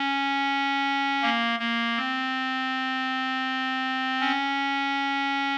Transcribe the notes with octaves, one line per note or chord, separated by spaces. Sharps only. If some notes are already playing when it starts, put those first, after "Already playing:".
Already playing: C#4
A#3
A#3
C4
C#4